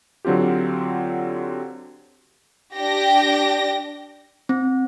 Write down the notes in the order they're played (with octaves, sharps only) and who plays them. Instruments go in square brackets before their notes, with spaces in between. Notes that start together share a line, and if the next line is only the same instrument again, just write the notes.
[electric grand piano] D3 F#3 C4 F4 G4
[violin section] D4 G4 G5 A#6
[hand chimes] C4